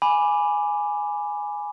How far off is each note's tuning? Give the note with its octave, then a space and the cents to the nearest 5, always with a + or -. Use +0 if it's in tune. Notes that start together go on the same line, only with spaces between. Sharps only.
G#5 +0 B5 +0 D6 +0